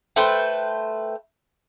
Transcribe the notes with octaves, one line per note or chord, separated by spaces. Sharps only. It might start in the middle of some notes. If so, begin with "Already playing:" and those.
A3 B4 C5 G5